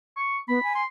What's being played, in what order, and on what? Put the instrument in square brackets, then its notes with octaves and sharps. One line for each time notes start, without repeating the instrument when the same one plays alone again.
[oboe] C#6
[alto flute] B3 [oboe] B5
[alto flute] G#5
[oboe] C6